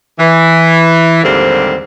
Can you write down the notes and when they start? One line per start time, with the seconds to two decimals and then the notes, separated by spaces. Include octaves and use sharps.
0.19 E3
1.23 D#2 G#2 D3 G3 C4